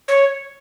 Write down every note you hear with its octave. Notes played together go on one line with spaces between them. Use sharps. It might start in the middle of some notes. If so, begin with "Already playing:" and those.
C#5